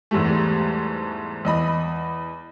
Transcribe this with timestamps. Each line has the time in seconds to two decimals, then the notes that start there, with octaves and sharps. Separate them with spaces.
0.11 E2 G#2 G3 A3
1.45 E2 D#5 B5